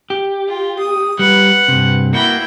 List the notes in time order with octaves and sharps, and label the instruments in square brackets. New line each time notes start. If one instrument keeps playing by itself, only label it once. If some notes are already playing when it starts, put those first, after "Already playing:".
[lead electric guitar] G4
[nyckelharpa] F4
D#6
[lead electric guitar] G3 [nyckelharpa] B4 F#5
[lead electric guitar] G2 C3
[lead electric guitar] A#3 F#4 [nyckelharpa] E4 G5